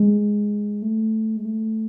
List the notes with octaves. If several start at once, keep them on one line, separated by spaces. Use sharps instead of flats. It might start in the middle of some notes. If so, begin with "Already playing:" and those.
Already playing: G#3
A3
G#3
A3